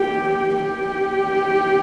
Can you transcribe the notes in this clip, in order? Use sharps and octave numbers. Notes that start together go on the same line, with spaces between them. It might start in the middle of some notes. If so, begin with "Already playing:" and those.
Already playing: G4
G4